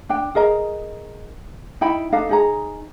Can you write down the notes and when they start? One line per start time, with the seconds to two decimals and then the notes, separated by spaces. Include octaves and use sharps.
0.09 D4 G5
0.35 G#4 A#4 D#5 A#5
1.81 D#4 E4 G5 B5
2.12 D4 D#4 A4 F5
2.29 D#4 G#4 A#5